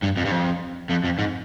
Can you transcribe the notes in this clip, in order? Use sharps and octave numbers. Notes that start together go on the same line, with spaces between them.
G2
F2
G2
F2
F2
F2
G#2